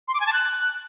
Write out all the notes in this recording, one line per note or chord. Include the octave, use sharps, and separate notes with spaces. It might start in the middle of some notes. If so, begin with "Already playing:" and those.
C6
D6
G#5
A5
F#6